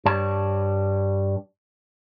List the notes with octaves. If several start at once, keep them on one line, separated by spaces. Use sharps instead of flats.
G2 G3 C#5 A5